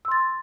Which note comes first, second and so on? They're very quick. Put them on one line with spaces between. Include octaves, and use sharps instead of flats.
E6 C6 A6